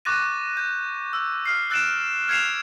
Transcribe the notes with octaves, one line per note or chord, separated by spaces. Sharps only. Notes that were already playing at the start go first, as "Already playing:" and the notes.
C#6 D6 F#6 A6 A#6 D#7
G6
E6
F6 C7
E6 F#6 A6 C7 D7 E7
F6 G#6 C7 C#7 E7 F7